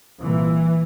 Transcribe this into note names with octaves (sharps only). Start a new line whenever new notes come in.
C2 A#2 E3